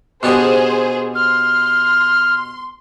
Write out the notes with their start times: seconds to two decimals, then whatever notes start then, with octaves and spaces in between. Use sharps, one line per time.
0.23 B2 D4 G4 G#4 C5
1.15 C6 F6